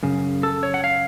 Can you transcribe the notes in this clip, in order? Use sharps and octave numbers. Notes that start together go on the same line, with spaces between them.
F#2 C#3
A4
C#5
F#5
F5